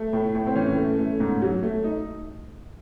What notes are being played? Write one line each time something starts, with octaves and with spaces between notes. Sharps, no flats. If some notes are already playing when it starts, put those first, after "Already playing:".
Already playing: A3
A2
A2
C4
E3 C#4
A3
A3
G#2
F#3
A3
D#4